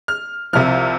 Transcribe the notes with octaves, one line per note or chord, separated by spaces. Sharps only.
F6
C2 C3 F3 F6